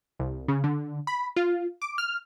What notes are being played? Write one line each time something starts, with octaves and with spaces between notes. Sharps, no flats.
C2
C#3
D3
B5
F4
D6
F6